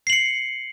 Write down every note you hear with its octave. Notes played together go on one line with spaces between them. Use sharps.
C7 C#7 F#7